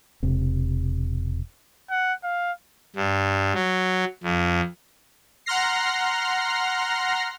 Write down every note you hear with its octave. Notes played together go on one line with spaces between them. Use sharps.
E1 C3
F#5
F5
G2
F#3
F2
F#5 A#5 C6 F6 A#6 C7